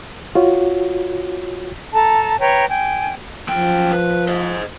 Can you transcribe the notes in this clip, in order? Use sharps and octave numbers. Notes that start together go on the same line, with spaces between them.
F4 F#4 C#5
A4 A5 A#5
B4 C#5 G5 A#5
G5 G#5
F#2 F3 G5
B4
C5 D#5